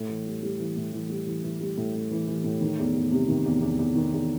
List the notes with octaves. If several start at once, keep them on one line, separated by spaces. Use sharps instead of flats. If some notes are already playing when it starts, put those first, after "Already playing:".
Already playing: A2
E3
G3
G3
E3
A2
E3
G3
E3
E3
G3
A2
A2
E3
E3
A2
D#3
E2
E2
C3
D#3
E2
E2
E2
D#3
E2